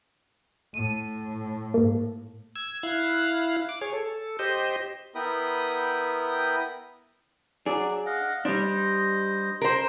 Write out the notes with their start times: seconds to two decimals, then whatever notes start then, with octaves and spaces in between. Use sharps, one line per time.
0.74 A2 D#7
1.74 G#2 A#3
2.56 E6 G#6
2.83 E4 F5 F#6
3.69 D6
3.81 G#4 C#5
3.94 A4
4.39 G4 C5 D#5
5.15 B3 E4 A#4 G5 B5 D#6
7.66 F#3 D4 G#4 D5
8.06 D#5 F5 F#5
8.45 G3 D4 C5 D#5
9.62 A#4 C5